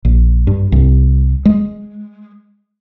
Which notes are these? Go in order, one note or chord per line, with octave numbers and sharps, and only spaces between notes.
A#1
G2
C2
G#3